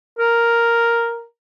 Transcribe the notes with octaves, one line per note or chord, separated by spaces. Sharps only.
A#4